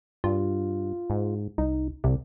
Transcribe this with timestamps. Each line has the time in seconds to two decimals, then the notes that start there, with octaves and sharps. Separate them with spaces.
0.24 G2 F4
1.10 G#2
1.58 C2 D#4
2.04 C2 C3